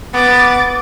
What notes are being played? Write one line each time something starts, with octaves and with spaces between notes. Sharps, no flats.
B3 D6 A6